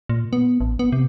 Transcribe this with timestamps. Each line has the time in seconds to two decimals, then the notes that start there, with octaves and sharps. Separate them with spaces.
0.09 A#2
0.33 B3
0.60 A1
0.79 B3
0.92 C3